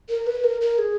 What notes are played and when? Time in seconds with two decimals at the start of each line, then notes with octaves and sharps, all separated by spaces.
0.09 A#4
0.27 B4
0.44 A#4
0.61 A#4
0.78 G#4